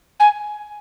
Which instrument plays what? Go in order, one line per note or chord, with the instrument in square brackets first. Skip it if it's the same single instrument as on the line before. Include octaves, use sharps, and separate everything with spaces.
[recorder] G#5